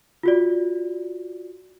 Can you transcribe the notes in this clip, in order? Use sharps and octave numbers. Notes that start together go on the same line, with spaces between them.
F4 F#4 D5